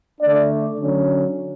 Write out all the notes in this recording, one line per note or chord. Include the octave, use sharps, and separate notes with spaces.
D3 A3 D4 D5
D3 F#3 C#4